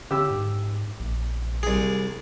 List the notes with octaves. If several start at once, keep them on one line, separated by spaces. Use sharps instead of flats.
D3 G4 E6
G#2
A#1
C2 G#4